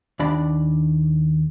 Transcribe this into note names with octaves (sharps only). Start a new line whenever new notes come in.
D#2 D4 D5 B5